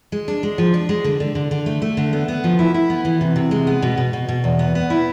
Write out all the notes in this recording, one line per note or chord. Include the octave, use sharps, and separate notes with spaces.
G#3
D4
G#3
F3
D4
G#3
D3
D3
D3
D3
A3
A3
D3
B3
B3
F3
E4
E4
B3
E3
C3
C3
G#3
B3
B2
B2
B2
B2
E2
B3
B3
E4